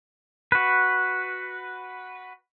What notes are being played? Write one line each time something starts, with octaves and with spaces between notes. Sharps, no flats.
F#4 B4